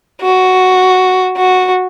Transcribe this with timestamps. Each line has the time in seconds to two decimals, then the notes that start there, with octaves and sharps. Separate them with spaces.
0.21 F#4
1.36 F#4